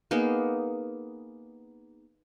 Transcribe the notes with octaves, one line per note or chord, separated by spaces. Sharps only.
A#3 B3 D#4 G#4